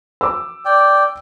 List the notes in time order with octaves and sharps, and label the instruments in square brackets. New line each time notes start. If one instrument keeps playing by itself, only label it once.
[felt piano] D6 E6
[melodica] D5 G5